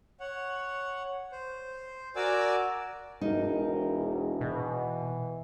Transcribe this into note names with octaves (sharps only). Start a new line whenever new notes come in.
C#5 F#5
C5
F#4 A#4 D5 G#5 D6 E6
E1 D#4 A#4
B2 E3